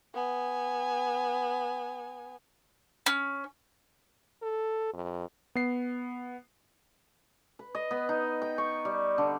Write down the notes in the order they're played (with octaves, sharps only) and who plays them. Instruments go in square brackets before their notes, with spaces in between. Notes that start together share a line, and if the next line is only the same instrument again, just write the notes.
[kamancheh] B3 G#5
[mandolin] C#4
[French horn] A4
F2
[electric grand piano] B3 C7
[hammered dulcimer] B4
D#5
B3
D#4
G5
C#6
G3
D3